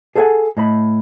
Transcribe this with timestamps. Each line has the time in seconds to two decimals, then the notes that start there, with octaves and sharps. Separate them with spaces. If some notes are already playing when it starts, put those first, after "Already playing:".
0.16 G#4 A4 C5 E5 F#5 G#5
0.57 A2 D#5 B5